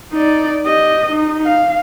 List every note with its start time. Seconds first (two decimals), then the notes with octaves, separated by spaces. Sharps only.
0.12 D#4 D5
0.66 G4 D#5
1.10 D#4
1.45 F5